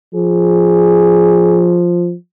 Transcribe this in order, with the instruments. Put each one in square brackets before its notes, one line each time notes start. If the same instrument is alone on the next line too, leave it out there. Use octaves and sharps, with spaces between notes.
[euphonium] F3 [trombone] G#4